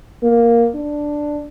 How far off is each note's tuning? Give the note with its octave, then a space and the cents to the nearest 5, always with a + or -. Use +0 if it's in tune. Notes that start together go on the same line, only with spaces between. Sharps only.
A#3 +5
D4 +5